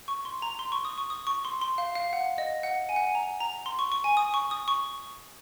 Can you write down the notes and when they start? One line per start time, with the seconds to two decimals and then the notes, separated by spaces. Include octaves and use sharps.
0.08 C#6
0.25 C6
0.42 A#5
0.59 C6
0.72 C#6
0.85 D#6
0.98 C#6
1.10 D#6
1.27 C#6
1.45 C6
1.61 C6
1.78 F5
1.95 F5
2.13 F#5
2.38 D#5
2.63 F#5
2.89 G#5
2.96 F#5
3.03 G#5
3.15 A#5
3.40 A#5
3.66 C6
3.79 C#6
3.92 C#6
4.04 G#5
4.17 D#6
4.34 C#6
4.51 D#6
4.68 C#6